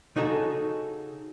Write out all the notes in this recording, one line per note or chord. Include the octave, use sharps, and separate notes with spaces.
C#3 D#4 F#4 G#4 A4 A#5